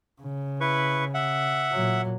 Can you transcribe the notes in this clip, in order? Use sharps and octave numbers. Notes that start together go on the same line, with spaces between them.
C#3
E4 B4 C#6
E5 F#5
A#2 F#3